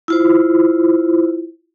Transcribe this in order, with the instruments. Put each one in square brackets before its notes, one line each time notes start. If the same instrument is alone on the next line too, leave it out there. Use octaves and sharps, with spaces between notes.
[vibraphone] E4 F4 C5